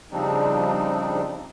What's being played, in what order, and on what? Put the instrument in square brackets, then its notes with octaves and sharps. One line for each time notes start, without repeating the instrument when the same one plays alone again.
[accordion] C#3 F3 G3 C4 D4 D#4